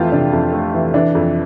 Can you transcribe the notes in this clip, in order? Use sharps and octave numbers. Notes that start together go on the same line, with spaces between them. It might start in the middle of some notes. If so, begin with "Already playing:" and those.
Already playing: F2 C3 E3 A3 F4 G4 A5
C3 D4
F2
A3
E3
E3 D4
F2